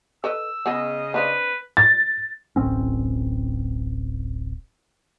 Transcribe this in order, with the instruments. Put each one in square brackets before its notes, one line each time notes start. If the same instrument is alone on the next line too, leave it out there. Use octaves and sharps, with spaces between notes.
[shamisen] A4 B4 D#5 [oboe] E6
[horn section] C#3 D#5 [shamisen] B3 G#4
[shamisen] C4 D4 F5 [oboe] B4
[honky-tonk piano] A6
[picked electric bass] D1 A1 C4 C#4